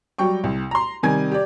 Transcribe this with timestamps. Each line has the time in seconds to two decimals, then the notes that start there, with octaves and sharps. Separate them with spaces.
0.19 F#3 G3 G5 C#6
0.44 C2
0.71 A#5 C6
1.03 C3 D#3 G3 G#5 G#6
1.31 G4 D5